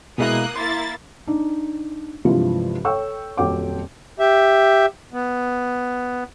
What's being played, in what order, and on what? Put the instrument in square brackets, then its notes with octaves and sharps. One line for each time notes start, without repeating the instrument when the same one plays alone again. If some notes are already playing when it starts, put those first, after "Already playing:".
[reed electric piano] B2 G#3 E4 [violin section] A#3 D#6 F#6
[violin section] A#3 E4 A6 [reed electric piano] C6
[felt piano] D4 D#4
G2 C3 E3 F3 G#3 F4
A4 C#5 G5 C#6 E6
D#1 F2 F#3 G5 D6
[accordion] G4 E5
B3